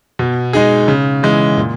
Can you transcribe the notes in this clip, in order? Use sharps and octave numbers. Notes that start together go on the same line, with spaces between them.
B2
G#3 D#4 G#4
C#3
E3 G#3
A#2